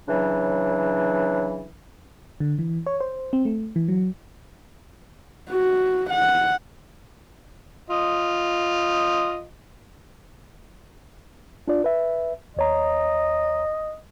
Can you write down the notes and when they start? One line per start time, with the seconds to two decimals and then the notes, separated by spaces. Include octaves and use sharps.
0.08 C#3 E3 F#3 D4
2.40 D3
2.59 E3
2.86 C#5
3.01 C5
3.33 C4
3.45 A3
3.76 E3
3.88 F#3
5.50 F#4
6.10 F#5
7.90 F4 D#5
11.68 D4 F4 D5
11.84 B4 E5
12.57 D#2 C#5 D#5 A#5